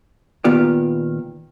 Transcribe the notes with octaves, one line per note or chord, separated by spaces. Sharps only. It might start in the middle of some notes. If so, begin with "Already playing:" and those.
A#2 D#3 B3 F4 G4 D5